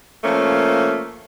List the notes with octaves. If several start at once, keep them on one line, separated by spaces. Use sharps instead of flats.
F3 A3 A#3 C#4